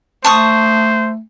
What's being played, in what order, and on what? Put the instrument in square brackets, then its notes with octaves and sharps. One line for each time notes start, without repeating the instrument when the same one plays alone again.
[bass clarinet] A3 [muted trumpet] C5 [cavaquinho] A5 C#6 D#6